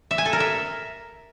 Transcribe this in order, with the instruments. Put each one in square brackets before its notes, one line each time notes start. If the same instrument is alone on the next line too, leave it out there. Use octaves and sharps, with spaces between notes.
[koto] E5
G#5
A4
A#4
E5